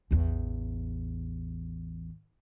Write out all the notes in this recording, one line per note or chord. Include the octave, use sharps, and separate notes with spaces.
A1 E2